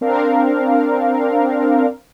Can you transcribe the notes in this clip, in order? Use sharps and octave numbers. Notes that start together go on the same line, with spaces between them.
C4 D4 A#4 F5